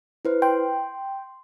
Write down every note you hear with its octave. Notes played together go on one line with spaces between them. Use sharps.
E4 B4 C5
G5 C6